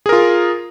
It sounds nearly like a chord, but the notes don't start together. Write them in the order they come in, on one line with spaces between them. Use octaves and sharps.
G#4 A#4 F4